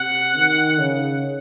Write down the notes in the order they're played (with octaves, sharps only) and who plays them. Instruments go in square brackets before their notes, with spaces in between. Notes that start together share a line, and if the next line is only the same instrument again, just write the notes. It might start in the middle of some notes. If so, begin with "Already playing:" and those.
Already playing: [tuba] C3 [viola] F#5
[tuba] D#3
C#3